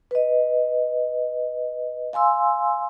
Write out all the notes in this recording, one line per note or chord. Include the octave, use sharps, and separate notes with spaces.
B4 D#5
F5 G#5 C6 E6